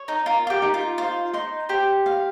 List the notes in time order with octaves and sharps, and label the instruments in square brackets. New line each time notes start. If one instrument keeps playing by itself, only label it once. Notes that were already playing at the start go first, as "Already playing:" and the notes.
Already playing: [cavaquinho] C#5
[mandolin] D#4
[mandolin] F4 [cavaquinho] A#4
[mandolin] F4
G4
[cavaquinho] D#4
[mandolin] F4
[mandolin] F4 [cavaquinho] C5
[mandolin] D#4 [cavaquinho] C6
[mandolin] G4 [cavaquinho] C5
[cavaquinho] F5